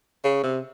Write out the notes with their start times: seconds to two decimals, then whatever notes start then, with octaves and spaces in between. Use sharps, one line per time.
0.24 C#3
0.43 C3